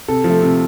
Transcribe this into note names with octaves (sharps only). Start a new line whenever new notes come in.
C3 A4
F3
A3
C3